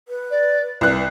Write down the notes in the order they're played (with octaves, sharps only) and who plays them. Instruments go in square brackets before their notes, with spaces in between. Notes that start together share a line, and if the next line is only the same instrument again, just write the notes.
[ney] B4
[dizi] D5
[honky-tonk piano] C2 F#6 [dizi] B4